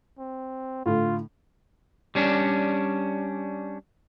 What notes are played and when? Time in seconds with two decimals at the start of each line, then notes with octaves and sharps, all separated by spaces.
0.18 C4
0.86 A2 D3 F4
2.15 G3 C#4 D4